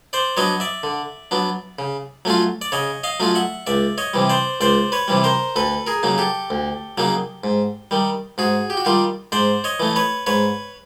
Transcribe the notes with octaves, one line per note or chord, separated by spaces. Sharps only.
C5 D5
F#3 B3 D4 C#5 D#5
D5 E5
D3
F#3 B3 D4
C#3
F#3 A3 C#4 F4
D5
C#3 C#5 D#5
D#5 F5
F#3 A3 C#4 F4
E5 F#5
C#2 D5 E5
C#5 D#5
C3 E3 G3
C5 D5
C#2 C5 D5
B4 C#5
C3 E3 G3
A#4 C5
D2 A4 B4
G#4 A#4
C#3 F#3 A#3 D#4
G4 A4
D2
C#3 F#3 A#3 D#4
G#2
D#3 G3
G#2 F#4 G#4
G4
F#4
D#3 G3 F4 G4
G#2 C5 D5
C#5 D#5
E3 A3
B4 C#5
G#2 B4 C#5